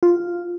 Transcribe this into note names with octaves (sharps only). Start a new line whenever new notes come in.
F4